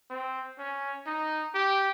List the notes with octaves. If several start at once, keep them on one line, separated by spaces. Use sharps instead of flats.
C4
C#4
D#4
G4